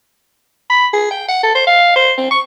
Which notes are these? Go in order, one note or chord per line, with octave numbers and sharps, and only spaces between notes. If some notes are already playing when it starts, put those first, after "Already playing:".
B5
G#4
G5
F#5
A4
C5
F5
C5
C4
C#6